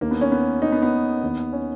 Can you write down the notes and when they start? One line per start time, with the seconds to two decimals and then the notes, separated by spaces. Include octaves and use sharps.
0.01 D#2 D#3 A#3
0.11 B3
0.21 C#4
0.32 B3
0.62 D#4
0.72 B3
0.82 B3
1.23 D#2 D#3
1.53 C#4